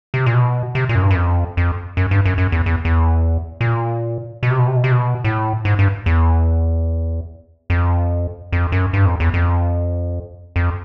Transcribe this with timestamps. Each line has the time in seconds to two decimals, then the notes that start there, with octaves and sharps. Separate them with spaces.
0.14 C3
0.26 A#2
0.34 B2
0.75 C3
0.89 A#2
0.95 F#2
1.02 G2
1.11 F#2
1.16 F2
1.57 F2
1.97 F#2
2.11 G2
2.25 F#2
2.38 F#2
2.52 E2
2.66 E2
2.85 E2
3.61 A#2
4.43 B2
4.51 C3
4.59 B2
4.67 C3
4.76 B2
4.84 C3
4.92 B2
5.24 A2
5.65 G#2
5.79 G2
6.06 E2
7.70 F2
8.52 F2
8.72 F#2
8.93 G2
9.06 F2
9.20 E2
9.34 F2
10.56 F2